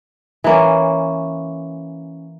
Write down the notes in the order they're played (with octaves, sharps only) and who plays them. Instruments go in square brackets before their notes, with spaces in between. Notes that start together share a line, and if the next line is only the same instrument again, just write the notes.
[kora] E3 A#3 C#4